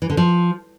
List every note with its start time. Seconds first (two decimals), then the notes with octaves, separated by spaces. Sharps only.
0.02 E3
0.10 D3
0.17 F3